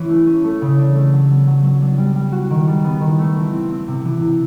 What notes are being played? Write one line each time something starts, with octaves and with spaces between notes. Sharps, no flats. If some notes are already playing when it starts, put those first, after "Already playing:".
Already playing: E3 C#4
A3
C#4
A3
C#3
D4
A3
F#3
B3
F#3
F#3
D4
G3
G3
F#4
D#3
G3
B3
D#3
A3
E3
C4
C4
C3
E3
C3